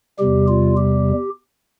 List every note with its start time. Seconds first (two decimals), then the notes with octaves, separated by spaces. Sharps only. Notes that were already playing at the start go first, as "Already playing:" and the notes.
0.19 E2 C3 G3 G4
0.48 F4
0.77 G4